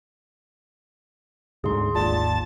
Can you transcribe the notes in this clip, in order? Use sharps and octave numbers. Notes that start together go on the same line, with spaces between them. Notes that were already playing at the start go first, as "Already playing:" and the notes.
D2 G#2 D3 G#4 C6
G#1 D#2 F4 D5 A5